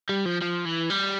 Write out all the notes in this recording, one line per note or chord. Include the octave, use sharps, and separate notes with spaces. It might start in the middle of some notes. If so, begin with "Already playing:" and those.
G3
F3
F3
E3
G3